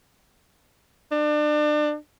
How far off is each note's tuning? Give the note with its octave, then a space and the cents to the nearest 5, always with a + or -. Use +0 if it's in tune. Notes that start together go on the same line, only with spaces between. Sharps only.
D4 +30